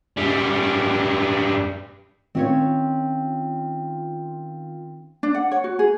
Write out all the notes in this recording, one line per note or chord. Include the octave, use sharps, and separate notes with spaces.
F#2 G3
D#3 C4 C#4 F4 C#5
D4
F#5
C#5
F#4
G#4